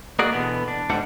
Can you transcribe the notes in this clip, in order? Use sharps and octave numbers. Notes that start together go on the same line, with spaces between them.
A#3 F#4 G#4 D5 D#5 F#5
B2 D3 E3 B3
D4
G#2 D3 G3 D4 F#5